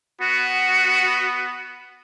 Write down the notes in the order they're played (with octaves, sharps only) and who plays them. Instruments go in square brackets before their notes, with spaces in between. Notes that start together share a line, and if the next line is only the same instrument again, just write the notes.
[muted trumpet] B3 [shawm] F#4